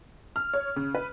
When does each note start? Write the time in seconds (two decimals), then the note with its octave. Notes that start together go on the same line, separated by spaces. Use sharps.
0.36 F6
0.53 C#5
0.76 C#3
0.95 B4